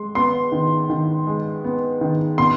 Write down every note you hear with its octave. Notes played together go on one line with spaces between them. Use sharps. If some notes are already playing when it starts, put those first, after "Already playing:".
Already playing: G#3 C6
B3 C6
D#3
D#3
G#3
B3
D#3
B2 C6